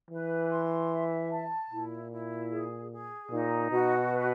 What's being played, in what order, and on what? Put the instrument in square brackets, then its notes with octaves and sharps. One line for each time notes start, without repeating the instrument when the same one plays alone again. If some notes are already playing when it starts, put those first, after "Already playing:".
[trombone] E3 [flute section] B4
[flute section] C6
E5
A5
[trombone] A#2 [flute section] E4
[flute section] E4
G#4
G#4
[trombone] A#2 [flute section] D#4
[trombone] B2 [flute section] F#4
[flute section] B4